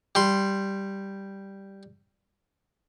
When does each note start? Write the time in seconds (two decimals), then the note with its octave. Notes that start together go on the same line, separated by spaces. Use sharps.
0.15 G3 C6